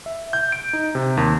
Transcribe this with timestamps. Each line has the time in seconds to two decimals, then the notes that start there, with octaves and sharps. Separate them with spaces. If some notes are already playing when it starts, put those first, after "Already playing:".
0.06 E5
0.33 G6
0.52 D7
0.73 D#4
0.95 C3
1.17 D#2